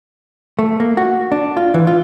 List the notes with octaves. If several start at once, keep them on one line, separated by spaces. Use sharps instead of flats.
A3
A#3
F#4
D4
F4
E3
F4